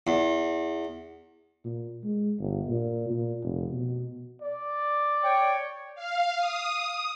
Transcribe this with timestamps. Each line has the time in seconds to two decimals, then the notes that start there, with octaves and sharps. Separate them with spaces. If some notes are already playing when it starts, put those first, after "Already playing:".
0.07 E2
1.64 A#2
2.04 G#3
2.39 G1
2.68 A#2
3.10 A#2
3.43 F1
3.72 B2
4.42 D5
5.23 C#5 G5
5.95 F5
6.37 D#6